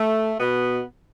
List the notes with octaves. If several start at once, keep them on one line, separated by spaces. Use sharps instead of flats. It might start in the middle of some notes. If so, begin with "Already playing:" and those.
Already playing: A3
B2 B3